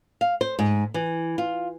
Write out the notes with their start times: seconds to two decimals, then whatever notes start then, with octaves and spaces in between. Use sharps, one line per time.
0.21 F5
0.41 C5
0.59 G#2
0.94 E3
1.38 F4